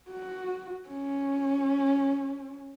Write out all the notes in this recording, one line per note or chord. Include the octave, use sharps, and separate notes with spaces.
F#4
C#4